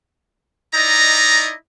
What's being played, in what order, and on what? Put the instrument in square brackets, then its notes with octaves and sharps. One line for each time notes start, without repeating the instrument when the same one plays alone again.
[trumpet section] D#4 E4 D5 D#5 A#5